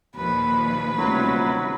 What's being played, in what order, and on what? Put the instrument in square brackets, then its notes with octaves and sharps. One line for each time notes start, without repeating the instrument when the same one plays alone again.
[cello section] D#2 A#2 F3 [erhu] B4
[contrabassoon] D#1 [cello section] D2 C3 F4 [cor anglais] F#3